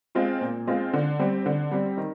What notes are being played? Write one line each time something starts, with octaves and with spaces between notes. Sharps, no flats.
G#3 C4 F4
A#2
G#3 C4 F4
D3
G3 C4
D3
G3 C4
D#3